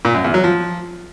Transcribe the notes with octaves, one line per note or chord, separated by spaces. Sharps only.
A#2
F#2
E2
F#3
F3